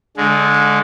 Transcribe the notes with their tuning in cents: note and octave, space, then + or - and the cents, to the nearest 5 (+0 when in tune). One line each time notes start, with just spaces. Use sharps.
D3 -20 G#3 +0